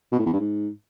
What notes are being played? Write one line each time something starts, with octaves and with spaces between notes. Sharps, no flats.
B2
A2
E2
G2
G#2